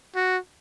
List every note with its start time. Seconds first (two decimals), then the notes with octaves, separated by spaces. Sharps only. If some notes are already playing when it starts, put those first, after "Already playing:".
0.15 F#4